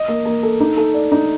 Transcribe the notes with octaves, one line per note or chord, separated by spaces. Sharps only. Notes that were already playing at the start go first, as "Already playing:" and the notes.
Already playing: D#5
A#3
A#3
A4
D#4
A4
D5
D#4